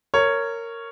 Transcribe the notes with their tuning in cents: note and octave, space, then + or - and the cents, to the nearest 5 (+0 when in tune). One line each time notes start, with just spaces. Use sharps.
A#4 -15 C#5 +0